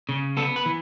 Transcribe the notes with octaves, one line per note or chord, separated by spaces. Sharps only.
C#3
B3 A4
B4
E3